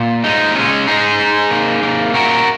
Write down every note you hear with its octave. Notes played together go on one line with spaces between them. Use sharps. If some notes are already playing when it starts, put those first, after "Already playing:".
Already playing: A#2
G#3 D#4
G#3 C#4
G#2 D#4 G#4
G#2
A#3
A#3
A#2 F#4 A#4